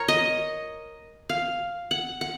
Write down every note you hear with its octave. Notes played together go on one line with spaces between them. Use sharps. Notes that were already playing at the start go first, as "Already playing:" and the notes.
Already playing: A#4 C#5
D#5
F5
F#5
F#5